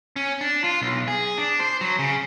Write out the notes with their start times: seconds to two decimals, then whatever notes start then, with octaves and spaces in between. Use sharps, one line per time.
0.16 C#4
0.41 D4
0.64 F4
0.81 B1
1.08 G#4
1.38 D4
1.60 C5
1.81 F#3
1.99 C#3